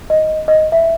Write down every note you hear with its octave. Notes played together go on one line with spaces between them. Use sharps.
D#5
D#5
E5